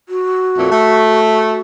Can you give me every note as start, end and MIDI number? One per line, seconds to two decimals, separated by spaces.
0.09 1.61 66
0.57 0.71 41
0.57 0.71 46
0.57 0.71 57
0.71 1.60 57